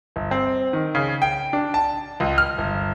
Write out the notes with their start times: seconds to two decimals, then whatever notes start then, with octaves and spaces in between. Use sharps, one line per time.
0.16 G1
0.31 C4
0.73 D#3
0.95 C#3
1.22 G5
1.53 D4
1.74 A5
2.20 C#2
2.38 F6
2.58 G1